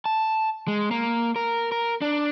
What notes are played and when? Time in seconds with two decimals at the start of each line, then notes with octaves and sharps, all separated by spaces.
0.06 A5
0.68 G#3
0.91 A#3
1.36 A#4
1.72 A#4
2.02 D4